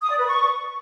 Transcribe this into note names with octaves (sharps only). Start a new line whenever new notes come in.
D#6
D5
B4
C#6